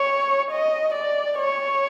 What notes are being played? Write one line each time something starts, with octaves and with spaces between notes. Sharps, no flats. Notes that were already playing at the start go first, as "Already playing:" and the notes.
Already playing: C#5
D#5
D5
C#5